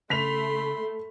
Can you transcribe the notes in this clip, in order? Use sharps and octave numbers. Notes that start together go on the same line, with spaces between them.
C#3 A3 B5 C6 B6 F7